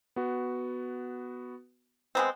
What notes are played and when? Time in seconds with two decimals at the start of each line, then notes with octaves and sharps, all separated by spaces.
0.16 B3 F#4
2.15 G#3 B3 C4